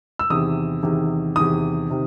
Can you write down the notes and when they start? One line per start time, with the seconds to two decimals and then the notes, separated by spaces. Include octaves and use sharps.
0.19 E6
0.30 E2 C3 D#3 D#6
0.83 E2 C3 D#3
1.36 E2 C3 D#3 D#6
1.90 C3 D#3